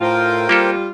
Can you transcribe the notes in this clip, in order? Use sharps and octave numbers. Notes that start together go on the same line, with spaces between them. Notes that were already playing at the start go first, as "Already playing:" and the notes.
A2 F4 A#4 C5 G5
G3 A#3 F4 G4 A4